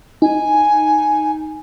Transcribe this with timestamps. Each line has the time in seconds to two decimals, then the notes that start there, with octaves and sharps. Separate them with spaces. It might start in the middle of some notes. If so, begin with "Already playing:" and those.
0.22 D#4 G#5